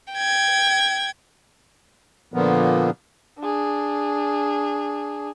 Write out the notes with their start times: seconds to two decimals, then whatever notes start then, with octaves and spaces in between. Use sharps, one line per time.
0.13 G5 G#6
2.34 A#2 D3 F3 A#3 B3
3.40 D4 G#4